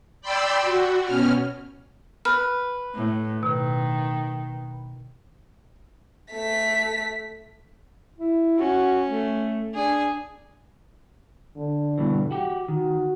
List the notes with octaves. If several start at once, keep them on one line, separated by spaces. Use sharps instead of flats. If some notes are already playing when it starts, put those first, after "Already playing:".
D5 G5 B5 C6 E6
F#4
B2 C#4 F6
B4 F6
A2
B2 D#3
A3 B6
E4
C#4 F#4
A3
D4 G#4 G#5
D3
G2 B2 E3
F#4 G4
D#3 F#4